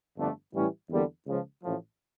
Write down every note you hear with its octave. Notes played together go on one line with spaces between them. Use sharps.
G1 F2 D3 A3 D4
A2 E3 G3 C#4 E4
E2 D3 G3 A#3
C#2 C#3 F3
A1 A2 F3